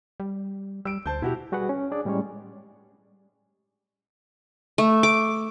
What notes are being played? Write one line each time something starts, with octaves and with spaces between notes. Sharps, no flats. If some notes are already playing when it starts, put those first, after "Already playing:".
G3
G3 E6 D7
D2 C5 A5 G6
B2 E4 F#4 G4
G3 F#4 G#4 B4 F#5
C#4
D4 G#4 D5
A2 G3 G#3 C#4 C#5
A3
D6